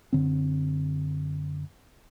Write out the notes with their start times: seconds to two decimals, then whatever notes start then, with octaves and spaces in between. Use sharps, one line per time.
0.13 F#2 D3 C4